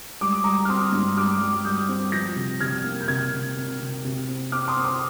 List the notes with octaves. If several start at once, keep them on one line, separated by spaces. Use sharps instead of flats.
G3 D6
D#6
G3 A#5 D6
F6
C4 C6 D#6
G2
G3 D6 F6
G3
G3 D#6 G6
C4
F3 G6 A#6
C3
C3 F6 G#6
A#3
G6
C3 F6 G#6
C3
C3
C3
C3
C4
C4 D6 F6
C6 D#6
C4
C6 D#6